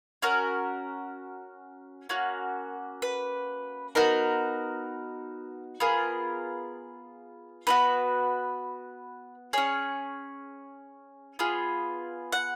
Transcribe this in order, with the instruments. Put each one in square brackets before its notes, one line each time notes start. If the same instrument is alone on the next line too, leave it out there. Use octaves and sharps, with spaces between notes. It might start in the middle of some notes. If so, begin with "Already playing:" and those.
[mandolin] C#4 F#4 A#4
A#3 C#4 F#4
B4
B3 D#4 F#4 A#4
B3 F4 G#4 A#4
B3 D#4 F#4 B4
C#4 G#4 C#5
B3 F4 G#4
F#5